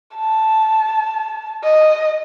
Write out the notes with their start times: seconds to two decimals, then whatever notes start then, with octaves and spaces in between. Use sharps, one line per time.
0.16 A5
1.64 D#5